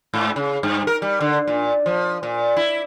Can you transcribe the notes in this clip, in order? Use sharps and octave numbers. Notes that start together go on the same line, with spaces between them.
G#2
C#3
G2
A#4
G3
D3
A#2
F3
A#2
E4